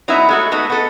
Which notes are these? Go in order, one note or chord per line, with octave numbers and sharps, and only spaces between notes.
F#3 B3 D#4 E4 B4 E5
G#3 A3 F#4
A3 B3 D#4 F#4
B3 A4